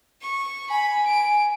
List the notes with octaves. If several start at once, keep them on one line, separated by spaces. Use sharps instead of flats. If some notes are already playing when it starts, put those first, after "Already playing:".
C#6
G#5 B5
D7